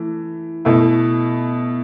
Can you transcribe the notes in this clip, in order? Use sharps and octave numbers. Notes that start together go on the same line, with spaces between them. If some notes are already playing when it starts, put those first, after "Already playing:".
Already playing: E3 A3
B2 A3 E4